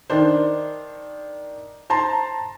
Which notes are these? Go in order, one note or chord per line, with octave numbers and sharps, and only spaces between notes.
D#3 D4 C5
C5 A5 A#5 C6